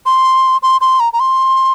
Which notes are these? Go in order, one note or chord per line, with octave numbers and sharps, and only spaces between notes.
C6
C6
C6
A#5
A#5
C6